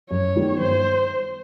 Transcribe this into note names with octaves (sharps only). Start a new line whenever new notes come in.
F#2 C#5
D#3 G3 B3
G2 C5